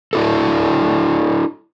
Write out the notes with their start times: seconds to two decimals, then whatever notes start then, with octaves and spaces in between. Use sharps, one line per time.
0.13 D4 E4 F#4 A4